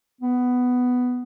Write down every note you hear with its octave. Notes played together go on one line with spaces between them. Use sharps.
B3